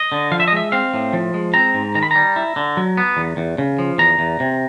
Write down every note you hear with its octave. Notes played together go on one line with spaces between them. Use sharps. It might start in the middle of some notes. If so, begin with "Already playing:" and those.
Already playing: D#5
D3
F3 F5
E5
D#5
G#3 E5
C4 F5
A2
F3
G#3
C4 A#5
G#2
D#3 A#5
B5
G3 A#5
E4
D3
F#3
B3
E2
E2
C#3
F3
E2 A#5
E2
C3